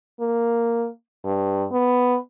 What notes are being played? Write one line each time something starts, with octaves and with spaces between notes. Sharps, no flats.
A#3
G2
B3